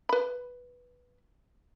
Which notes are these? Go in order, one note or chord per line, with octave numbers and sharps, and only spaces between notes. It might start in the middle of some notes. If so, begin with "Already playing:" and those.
B4 B5